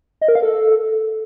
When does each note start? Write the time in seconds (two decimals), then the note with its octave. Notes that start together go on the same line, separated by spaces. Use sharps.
0.21 D#5
0.28 A#4
0.35 F5
0.42 A4